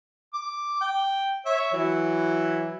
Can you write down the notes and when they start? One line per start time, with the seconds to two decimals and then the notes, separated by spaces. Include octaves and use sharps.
0.34 D6
0.81 G5
1.46 C#5 E5
1.73 E3 F#3 E4